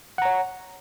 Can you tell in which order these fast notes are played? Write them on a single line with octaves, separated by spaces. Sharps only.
F#5 A#5 C#5